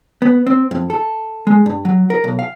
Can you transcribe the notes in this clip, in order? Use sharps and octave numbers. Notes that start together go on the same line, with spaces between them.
B3
C4
F2
A4
G#3
G2
F#3
A#4
B1
F5